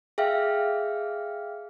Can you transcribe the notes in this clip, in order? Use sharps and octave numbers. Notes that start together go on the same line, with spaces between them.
G#4 E5 F5 G5 F6